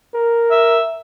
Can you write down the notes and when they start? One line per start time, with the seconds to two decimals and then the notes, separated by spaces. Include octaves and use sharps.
0.14 A#4
0.51 E5